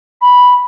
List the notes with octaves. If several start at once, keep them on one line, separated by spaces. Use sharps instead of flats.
B5